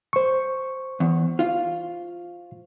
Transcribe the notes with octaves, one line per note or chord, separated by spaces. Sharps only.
C5 C#6
E2
F4 F5